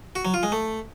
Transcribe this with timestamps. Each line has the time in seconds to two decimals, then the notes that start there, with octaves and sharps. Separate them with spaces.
0.16 F#4
0.25 F#3
0.34 F4
0.43 G#3
0.52 A3